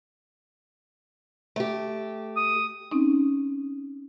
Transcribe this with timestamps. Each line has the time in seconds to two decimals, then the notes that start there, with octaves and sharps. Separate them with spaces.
1.56 A3 G4
2.36 D#6
2.91 C4 C#4 D#4